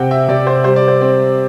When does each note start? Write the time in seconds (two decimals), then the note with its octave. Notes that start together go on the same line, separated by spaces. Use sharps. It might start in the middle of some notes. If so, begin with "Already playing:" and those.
Already playing: C3 C4 F#5 G5
0.11 E5
0.28 C3 D5
0.47 C5
0.64 G3 C5
0.76 D5
0.88 C5
1.01 C4